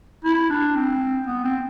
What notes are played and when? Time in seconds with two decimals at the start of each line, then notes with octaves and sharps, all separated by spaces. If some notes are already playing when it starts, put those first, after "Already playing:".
0.24 E4
0.50 D4
0.75 C4
1.27 B3
1.44 C4